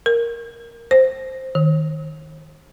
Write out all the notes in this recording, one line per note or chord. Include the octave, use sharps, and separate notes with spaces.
A#4
C5
D#3